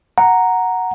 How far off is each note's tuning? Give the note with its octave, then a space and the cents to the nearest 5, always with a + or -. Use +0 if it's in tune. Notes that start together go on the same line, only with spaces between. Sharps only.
F#5 +0 A#5 +0